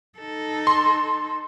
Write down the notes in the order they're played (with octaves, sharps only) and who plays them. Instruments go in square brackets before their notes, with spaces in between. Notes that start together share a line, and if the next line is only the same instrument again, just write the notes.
[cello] D#4 A4
[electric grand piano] C6